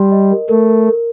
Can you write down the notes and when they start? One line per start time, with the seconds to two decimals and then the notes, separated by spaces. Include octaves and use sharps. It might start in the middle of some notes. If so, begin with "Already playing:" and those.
Already playing: G3 C6
0.12 D#5
0.31 A#4
0.49 A3 A#4
0.68 A#4
0.86 A#4